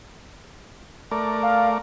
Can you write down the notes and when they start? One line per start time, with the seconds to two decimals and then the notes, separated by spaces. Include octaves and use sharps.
1.12 A3 A#4 D5
1.43 F5